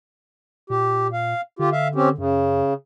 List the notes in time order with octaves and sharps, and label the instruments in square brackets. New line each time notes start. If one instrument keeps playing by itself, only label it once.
[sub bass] A#2 [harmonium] G4
[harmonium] F5
[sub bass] D3 [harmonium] F4 G4
[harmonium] E5 F5
C4 C#4 G4
[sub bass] F#2 [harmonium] C#3